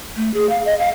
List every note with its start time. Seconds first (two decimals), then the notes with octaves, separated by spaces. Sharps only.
0.16 A3
0.33 G#4
0.49 F5
0.65 D#5
0.79 F5